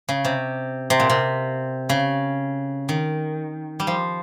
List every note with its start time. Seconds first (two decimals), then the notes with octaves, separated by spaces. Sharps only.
0.09 C#3
0.25 C3
0.90 C3
1.00 A#2
1.10 C3
1.89 C#3
2.89 D#3
3.80 G3
3.87 F3